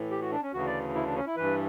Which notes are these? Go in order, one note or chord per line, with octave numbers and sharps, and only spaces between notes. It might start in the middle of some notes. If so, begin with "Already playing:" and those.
Already playing: A2 E3
G4
F#4
D4
C#4
D2 C#3 E3 F#4
D5
E4
D4
C#4
E4
G2 E3 B4